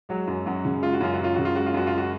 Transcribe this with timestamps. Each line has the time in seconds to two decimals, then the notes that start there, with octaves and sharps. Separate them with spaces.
0.09 F#3 G#3 F#4
0.28 F#2
0.45 F#2 F#3 F#4
0.65 C#3
0.82 G#3 F4
0.93 F#4
1.01 F#2 F4
1.14 F#4
1.19 F#2 F4
1.34 C#3 F#4
1.45 F4
1.55 G#3 F#4
1.66 F4
1.74 F#2 F#4
1.87 F4
1.98 F#4